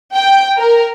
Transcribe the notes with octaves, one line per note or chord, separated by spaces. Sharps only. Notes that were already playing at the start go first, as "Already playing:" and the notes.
G5
A#4